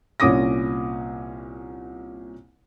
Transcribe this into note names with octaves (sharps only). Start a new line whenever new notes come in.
C2 A#2 C#4 D6 D#6 A#6